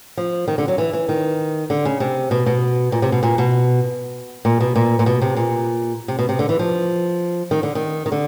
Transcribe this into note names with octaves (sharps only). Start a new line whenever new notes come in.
F3
D#3
D3
F#3
E3
E3
D#3
D3
C#3
C3
B2
B2
A#2
C3
B2
A#2
B2
A#2
B2
A#2
A#2
B2
C3
A#2
C3
B2
C3
D3
E3
F3
D#3
D3
D#3
D#3
D3